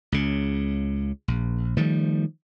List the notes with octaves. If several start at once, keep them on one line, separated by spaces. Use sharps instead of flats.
C#2 C#3
A#1
D#3 F3 G3 A3